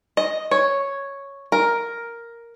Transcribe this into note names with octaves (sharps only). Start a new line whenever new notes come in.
D#5
C#5
A#4